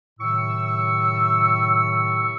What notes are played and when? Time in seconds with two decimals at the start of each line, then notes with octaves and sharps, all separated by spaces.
0.20 A2 C3 D#3 F#3 C#6 E6